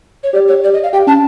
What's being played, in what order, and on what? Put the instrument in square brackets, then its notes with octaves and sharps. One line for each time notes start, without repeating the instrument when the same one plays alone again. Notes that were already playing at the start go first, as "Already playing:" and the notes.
[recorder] C#5
[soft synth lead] G4 [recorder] D5
[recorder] C#5
D5
D#5
F5
[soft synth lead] G4 [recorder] G5
[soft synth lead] C#4 [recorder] A5